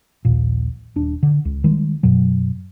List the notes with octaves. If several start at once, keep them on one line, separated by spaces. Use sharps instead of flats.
A#1 D#2 A#2
D#1 D4
D3
C#2
D#3 G3 G#3
F#2 B2 F#3